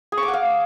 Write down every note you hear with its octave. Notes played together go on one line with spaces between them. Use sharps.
G#4
C#6
D6
F#5
F5